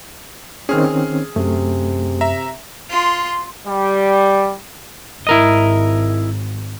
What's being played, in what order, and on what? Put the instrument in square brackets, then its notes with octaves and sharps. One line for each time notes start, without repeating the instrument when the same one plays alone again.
[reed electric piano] D#3 C4 C#4 [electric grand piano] G#4 F6
[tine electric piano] F#2 [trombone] C3 [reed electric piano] A3
[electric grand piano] E5 A#5
[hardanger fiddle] F4 C6
[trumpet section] G3
[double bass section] G#1 [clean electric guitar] E4 A#4 D#5